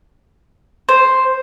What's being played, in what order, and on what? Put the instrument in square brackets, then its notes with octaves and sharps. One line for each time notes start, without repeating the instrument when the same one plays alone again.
[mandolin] C5